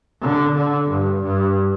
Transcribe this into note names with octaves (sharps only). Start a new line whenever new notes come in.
D3
D3
G2
G2